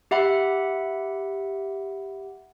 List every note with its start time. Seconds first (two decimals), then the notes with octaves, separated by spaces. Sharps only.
0.11 G4 E5 F#5 B5